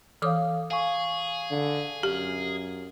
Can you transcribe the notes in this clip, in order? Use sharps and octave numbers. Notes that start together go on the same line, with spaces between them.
E3 A4 C#5 F5 D6 D#6
G#4 F5 G#5 C#6
D3
F#2 G4